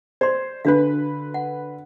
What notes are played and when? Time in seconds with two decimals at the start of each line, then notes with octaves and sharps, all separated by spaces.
0.21 C5 D5 C6
0.65 D3 D4 F#4 B4 F5
1.34 F#5